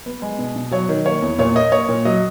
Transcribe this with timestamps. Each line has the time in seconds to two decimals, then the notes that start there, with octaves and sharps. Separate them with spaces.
0.06 B3
0.22 G#3
0.39 B2
0.56 B2
0.72 F#3 C#5
0.89 D#3
1.05 A#3 C#5
1.22 E2
1.39 A#2 C#5
1.55 A#3 D#5
1.72 A#3 C#5
1.89 A#2
2.05 F#3 D#5